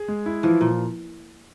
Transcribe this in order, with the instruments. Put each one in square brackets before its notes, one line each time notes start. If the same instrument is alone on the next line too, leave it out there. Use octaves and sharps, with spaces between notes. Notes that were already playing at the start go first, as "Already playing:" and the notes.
Already playing: [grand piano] G#4
G#3
E4
[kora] E3 [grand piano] F3
[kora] A#2 [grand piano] F3